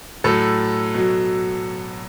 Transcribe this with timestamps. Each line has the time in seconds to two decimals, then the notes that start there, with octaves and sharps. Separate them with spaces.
0.24 A2 F#3 A4
0.94 B2 F#3